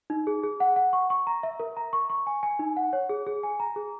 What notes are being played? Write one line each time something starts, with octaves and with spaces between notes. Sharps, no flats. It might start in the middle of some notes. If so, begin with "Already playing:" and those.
D#4
G#4
G#4
F#5
F#5
C#6
C#6
A#5
E5
A#4
A#5
C#6
C#6
G#5
G#5
D#4
F#5
C#5
G#4
G#4
G#5
A#5
G#4